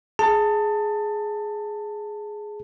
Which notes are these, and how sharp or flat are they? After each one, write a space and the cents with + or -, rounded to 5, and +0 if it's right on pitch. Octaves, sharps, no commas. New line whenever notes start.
G#4 +10 A5 +20